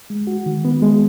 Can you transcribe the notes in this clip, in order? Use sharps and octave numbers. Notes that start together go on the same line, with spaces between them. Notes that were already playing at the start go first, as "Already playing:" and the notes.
G#3
F#4
D#3
B3
G#3